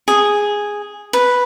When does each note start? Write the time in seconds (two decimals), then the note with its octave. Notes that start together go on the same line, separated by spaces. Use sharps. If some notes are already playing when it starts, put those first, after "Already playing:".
0.08 G#4
1.13 B4